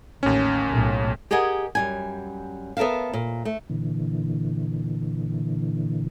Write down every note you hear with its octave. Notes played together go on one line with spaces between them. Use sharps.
A1 D#2 C#4
B1 A2
G4 G#4 A#4 D#5 F#5 G#5
F#2 G3 G#5
B3 A4 A#4 E5 F5
A#2
A3
A#2 D3 E3